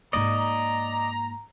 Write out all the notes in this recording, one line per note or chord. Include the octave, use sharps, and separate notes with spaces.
G#2 A#3 D5 D#5 A#5